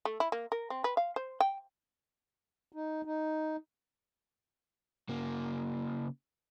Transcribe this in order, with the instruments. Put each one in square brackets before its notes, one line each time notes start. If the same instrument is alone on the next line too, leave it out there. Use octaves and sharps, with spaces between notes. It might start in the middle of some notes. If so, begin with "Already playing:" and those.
[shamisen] A3
E4
A#3
A#4
C4
B4
F5
C5
G5
[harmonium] D#4
D#4
[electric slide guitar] C#3 A#3